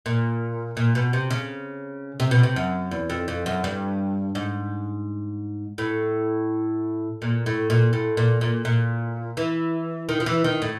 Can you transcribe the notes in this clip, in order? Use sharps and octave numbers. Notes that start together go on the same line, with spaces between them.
A#2
A#2
B2
C3
C#3
C3
B2
C3
F#2
E2
F2
F2
F#2
G2
G#2
A2
A#2
A2
A#2
A2
A#2
A#2
A#2
E3
D#3
F3
E3
D#3
A2